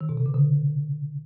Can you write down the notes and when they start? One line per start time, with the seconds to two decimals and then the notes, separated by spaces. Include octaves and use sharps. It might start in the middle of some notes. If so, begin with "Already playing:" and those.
0.01 D#3
0.09 B2
0.17 C3
0.26 C#3
0.34 D3